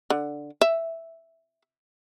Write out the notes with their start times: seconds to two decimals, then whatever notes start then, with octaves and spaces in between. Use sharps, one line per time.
0.10 D3
0.61 E5